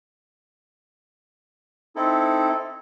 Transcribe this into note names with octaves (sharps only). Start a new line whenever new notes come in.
C4 D#4 E4 A4